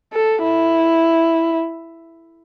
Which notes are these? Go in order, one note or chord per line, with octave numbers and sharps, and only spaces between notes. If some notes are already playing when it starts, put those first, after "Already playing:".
A4
E4